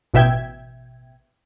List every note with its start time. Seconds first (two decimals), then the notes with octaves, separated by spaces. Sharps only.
0.14 A1 B2 E5 G5 G#6